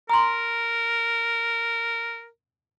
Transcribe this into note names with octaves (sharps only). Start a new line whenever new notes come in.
A#4 A#5 C6